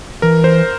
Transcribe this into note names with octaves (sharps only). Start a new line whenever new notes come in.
E3 A#4
C5